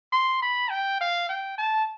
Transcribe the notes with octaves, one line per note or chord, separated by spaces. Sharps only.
C6
B5
G5
F5
G5
A5